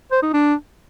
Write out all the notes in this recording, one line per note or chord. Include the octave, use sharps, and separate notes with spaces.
C5
D#4
D4